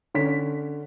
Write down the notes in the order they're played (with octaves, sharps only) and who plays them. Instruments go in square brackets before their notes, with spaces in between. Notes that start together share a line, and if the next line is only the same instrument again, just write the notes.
[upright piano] D3 C#4 B6